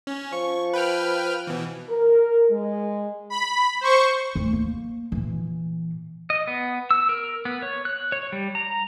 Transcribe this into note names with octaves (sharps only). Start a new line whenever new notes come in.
C#4
F3 C#6
B4 G5 F6
B2 E3
A#4
G#3
B5
C5 C#6
D2 G3
A#3
A#2 E3
D#5
B3
E6
A#4
B3
C#5
F#6
C#5
G3
A#5